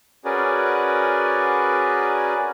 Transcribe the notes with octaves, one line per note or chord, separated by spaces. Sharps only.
C#4 F#4 G#4 A#4 B4 D5